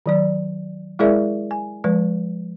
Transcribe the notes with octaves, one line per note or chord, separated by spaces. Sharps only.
D#3 F#3 D5
G#3 E4 G#4 A#4 D5 E5
G#5
F3 G#3 B4